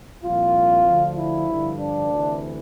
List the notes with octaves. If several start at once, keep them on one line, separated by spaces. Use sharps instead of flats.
C2 A#2 F3 F4
D2 D3 F3
E4
G2 D3 F3
D4
D2 C3 E3